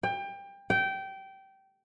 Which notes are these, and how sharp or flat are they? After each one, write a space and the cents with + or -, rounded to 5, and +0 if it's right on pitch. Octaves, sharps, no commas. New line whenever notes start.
G5 +25
G5 -20